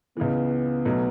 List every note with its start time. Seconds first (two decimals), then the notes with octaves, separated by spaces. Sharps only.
0.17 C#2 C#3 E3 B3
0.85 B1 B2 F#3 A3